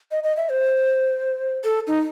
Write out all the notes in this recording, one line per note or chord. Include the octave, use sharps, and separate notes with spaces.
D#5
D#5
E5
C5
A4
D#4